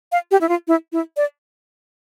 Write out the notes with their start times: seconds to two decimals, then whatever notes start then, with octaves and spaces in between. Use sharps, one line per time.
0.12 F5
0.31 G4
0.41 E4
0.49 F4
0.68 E4
0.92 E4
1.17 D5